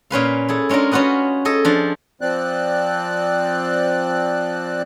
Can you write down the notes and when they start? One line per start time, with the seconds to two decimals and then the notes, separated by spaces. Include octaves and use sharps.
0.10 A#2 C#4 B4 F5
0.49 E4 G#4 A4
0.69 G#3 C#4 D4 F4 A#4
0.92 C#4 F4 F#4 B4 D#5
1.45 G#4 A4 D#5
1.65 F3 D4
2.21 F3 C4 D5 F#6